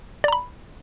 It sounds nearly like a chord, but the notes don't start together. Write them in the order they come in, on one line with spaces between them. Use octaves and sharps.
D5 A#5 B5